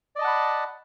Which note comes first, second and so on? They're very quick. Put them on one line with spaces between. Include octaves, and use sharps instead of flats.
D5 D#5 A5 F#5 B5